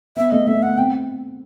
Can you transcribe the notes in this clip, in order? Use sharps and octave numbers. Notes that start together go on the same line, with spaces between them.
B3 E5
A3 D#5
A3 E5
B3 F#5
C4 G5